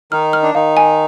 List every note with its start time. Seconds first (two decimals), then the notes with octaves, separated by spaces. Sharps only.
0.12 D#3 D#4 F6
0.33 F6
0.43 D4
0.54 D#3 D#4 F5
0.77 G#5